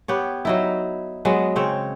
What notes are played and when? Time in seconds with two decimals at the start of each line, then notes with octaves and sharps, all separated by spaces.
0.08 B3 G4 C#5
0.45 F#3 D#4 E4
1.25 F#3 G#3 B3
1.56 C#3 C4 C#5